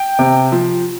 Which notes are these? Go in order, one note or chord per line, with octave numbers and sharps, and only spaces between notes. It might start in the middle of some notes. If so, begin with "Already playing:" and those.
Already playing: G5
C3
F3